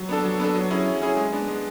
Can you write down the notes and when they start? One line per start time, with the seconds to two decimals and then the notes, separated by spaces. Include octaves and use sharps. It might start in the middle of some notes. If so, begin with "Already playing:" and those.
Already playing: F#3
0.09 B3 D4 A4
0.25 F#3
0.40 B3 D4 A4
0.55 F#3
0.71 C#4 E4 G#4
0.86 F#3
1.02 C#4 E4 G#4
1.17 G#3
1.32 B3 D4
1.48 G#3